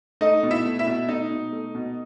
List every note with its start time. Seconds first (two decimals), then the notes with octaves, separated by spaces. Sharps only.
0.21 A3 D#4 D#5
0.43 B2
0.51 E4 E5
0.65 A3
0.79 E4 E5
0.87 B2
1.09 A3 D#4 D#5
1.30 B2
1.52 A3
1.75 B2